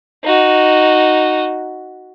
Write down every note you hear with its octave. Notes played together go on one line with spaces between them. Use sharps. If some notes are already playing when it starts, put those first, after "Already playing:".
D#4 F#4